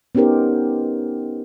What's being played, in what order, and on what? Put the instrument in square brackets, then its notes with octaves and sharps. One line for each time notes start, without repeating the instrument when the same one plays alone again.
[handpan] B3 C#4 D#4 G4 A#4 C5